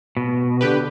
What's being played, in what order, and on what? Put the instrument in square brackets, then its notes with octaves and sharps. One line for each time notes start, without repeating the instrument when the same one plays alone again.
[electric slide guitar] B2
[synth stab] D3 G4 B4